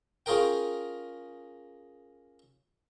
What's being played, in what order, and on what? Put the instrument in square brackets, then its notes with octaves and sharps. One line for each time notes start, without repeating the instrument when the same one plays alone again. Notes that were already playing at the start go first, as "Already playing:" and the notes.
[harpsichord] C#4 F4 G#4 A#4 G5